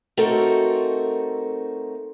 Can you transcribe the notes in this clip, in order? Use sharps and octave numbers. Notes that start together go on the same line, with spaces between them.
A3 C4 D#4 F#4 A4 A#4